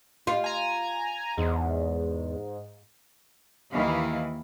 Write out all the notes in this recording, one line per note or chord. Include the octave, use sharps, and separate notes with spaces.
F4
G#5 A#5
E2 G#2
D#2 D#3 E3 E4 F5